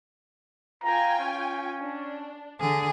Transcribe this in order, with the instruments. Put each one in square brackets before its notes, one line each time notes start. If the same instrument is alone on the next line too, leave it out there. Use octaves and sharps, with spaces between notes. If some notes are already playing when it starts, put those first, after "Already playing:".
[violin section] F4 G5 G#5 [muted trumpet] A#5
[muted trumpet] C#4
[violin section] D4
[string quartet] D3 G#4